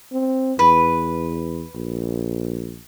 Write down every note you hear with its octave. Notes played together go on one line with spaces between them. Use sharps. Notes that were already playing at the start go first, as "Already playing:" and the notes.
C4
E2 B4
A#1